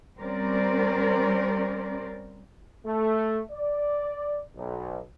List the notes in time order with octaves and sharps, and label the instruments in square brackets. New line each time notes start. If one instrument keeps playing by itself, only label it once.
[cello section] G3 C4 C#4 A#4 C5 D5
[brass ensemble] A3
D5
B1